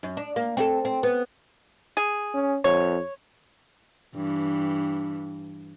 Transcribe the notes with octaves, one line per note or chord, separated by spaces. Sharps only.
F#2
D4
A#3
C4 F#4 A4
C4
B3
G#4
C#4
F2 C#5
G2 E3